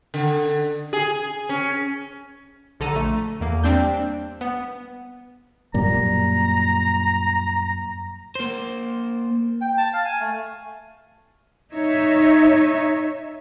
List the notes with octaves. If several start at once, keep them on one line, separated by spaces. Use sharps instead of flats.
D3
G#4
C#4
A#1 D3 A4 A#5 D#7
A3
E2 A#3
G3 C4 D4 G6
B3
F#2 A#2 G3 A#5
A#3 C5
G5
A5
F5
G#5
A3
D#4 C#5 E5